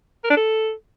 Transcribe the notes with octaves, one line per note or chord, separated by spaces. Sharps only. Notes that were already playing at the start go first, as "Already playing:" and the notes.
A#4
D4
A4